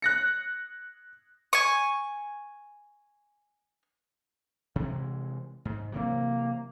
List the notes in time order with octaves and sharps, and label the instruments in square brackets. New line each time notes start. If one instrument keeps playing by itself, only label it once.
[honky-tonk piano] F#6 A#6 C#7
[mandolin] G#5 C#6
[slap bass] C3 E3 G#3
G#2
[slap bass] C3 E3 F#3 [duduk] A#3